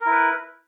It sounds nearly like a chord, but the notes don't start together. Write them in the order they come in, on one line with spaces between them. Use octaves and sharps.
A#4 E4 B4